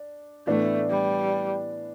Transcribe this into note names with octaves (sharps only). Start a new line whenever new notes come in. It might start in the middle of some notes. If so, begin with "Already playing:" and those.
Already playing: D4
A2 E3 A3 B3 D4
G3